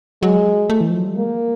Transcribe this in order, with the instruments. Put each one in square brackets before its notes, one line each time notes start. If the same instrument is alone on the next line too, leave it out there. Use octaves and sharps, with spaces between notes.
[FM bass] F#3 [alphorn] G#3
[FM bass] A3
E3
F3
F#3
G3
[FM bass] G#3 [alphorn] A#3